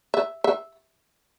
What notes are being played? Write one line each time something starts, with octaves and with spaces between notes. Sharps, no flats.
E5
E5